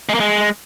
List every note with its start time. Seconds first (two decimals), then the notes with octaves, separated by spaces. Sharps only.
0.09 G#3
0.14 A#3
0.20 G#3